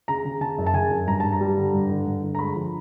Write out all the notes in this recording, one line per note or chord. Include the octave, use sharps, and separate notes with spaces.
C#3 A#5
C#3
C#3 A5
F#2
A5
C#3 G#5
F#2
G2 A#5
G2 A5
A#5
G3
D3
G2
D3
G2
D3
A#5
G#3 B5
F3